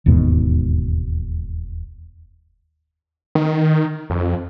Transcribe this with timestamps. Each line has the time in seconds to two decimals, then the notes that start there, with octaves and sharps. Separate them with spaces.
0.06 E1 D#2 G#2 B2
3.35 D#3
4.10 F2